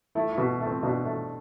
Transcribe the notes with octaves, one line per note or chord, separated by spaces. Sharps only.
A3 E4
E4
B2
A3
C4
B2 D4
A3